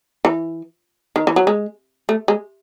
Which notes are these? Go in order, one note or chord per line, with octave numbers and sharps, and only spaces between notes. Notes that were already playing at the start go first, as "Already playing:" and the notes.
E3
D#3
E3
F#3
G#3
A3
G#3